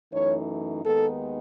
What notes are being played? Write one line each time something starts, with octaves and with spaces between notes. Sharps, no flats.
F#2 E3 A3 D#4 C#5
D#2 D#3 G#3 B3 D#4 A4